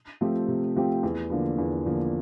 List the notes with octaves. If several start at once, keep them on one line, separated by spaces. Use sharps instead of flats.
F3 A3 C4 G4
C3
F3 A3 C4 G4
E2
D3 F3 A#3
E2
D3 F3 A#3